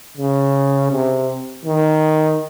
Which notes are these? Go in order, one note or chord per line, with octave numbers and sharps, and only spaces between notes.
C#3
C3
D#3